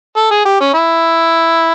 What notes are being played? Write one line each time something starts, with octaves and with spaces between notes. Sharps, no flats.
A4
G#4
G4
C#4
E4